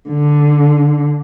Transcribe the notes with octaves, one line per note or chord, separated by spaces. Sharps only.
D3